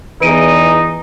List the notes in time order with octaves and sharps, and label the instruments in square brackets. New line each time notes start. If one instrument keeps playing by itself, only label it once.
[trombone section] E2 [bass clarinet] E3 [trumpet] D#4 [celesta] B4 D7 D#7